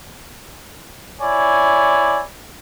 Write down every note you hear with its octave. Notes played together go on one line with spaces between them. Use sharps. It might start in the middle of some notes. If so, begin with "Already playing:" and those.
E4 C#5 D5 G#5